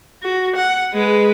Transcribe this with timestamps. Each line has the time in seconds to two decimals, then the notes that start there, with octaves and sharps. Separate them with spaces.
0.23 F#4
0.56 F#5
0.93 G#3 B4